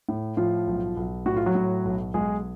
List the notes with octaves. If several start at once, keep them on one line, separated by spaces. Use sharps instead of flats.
A2
A2 F3 F4
B1
B1
A2 F#4
F4
F#3 F#4
A2
B1
B1 G#3 G#4